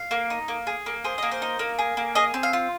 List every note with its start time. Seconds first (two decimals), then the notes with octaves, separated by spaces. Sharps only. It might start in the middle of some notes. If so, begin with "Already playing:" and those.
Already playing: F5
0.11 A#3
0.30 D#4
0.48 A#3
0.67 G#4
0.86 A#3
1.04 G#4 C5
1.18 A#3 D#5
1.31 C5
1.42 D#4
1.59 A#3
1.79 G#4
1.97 A#3
2.15 G#4 D#5
2.34 C4
2.43 F5
2.53 F4